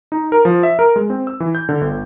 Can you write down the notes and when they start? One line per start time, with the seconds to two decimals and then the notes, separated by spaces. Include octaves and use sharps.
0.12 D#4
0.32 A#4
0.45 F3
0.63 E5
0.79 A#4
0.96 G#3
1.10 C4
1.27 E6
1.40 E3
1.55 G6
1.69 D3
1.81 G1